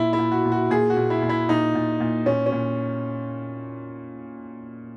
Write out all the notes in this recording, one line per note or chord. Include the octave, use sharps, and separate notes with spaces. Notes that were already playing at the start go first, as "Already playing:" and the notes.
Already playing: A#2 E4
E4
A#2
F#4
A#2
F#4
A#2 G#4
F#4
A#2
E4
A#2
E4
A#2 D#4
A#2
A#2
A#2 C#4
C#4
A#2